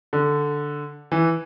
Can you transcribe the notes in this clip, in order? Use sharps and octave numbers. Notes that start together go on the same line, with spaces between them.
D3
E3